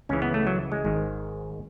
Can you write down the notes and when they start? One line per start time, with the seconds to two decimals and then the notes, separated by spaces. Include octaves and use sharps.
0.09 C#2 C#3 E3 C#4
0.22 B3
0.34 A3
0.47 F#3
0.72 G#3
0.85 G#1 G#2 D#3